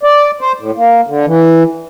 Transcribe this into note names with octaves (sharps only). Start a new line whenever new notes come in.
D5
C5
A2
A#3
D3
E3